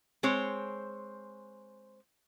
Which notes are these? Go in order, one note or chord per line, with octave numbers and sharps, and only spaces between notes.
G#3 C4 C5 C#5